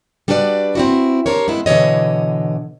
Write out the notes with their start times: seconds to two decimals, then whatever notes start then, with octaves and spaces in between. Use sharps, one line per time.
0.28 G3 D4 F#4 B4 C#5 D5
0.75 C4 E4 F#4
1.26 D4 G4 A#4 C5 C#5
1.48 G#3 B3 C4 E4
1.66 B2 D3 E3 C#5 D#5